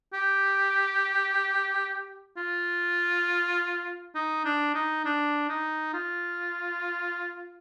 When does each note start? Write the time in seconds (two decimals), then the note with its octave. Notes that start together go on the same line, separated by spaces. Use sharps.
0.13 G4
2.37 F4
4.14 D#4
4.45 D4
4.74 D#4
5.05 D4
5.49 D#4
5.93 F4